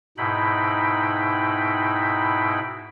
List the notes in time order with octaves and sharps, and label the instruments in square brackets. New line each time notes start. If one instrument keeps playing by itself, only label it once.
[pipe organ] G#2 B2 D#4 E4 G5 B5